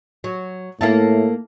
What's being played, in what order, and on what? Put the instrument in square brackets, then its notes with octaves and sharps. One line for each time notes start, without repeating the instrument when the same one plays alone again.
[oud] F#3
[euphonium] A2 [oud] A#3 E4 A4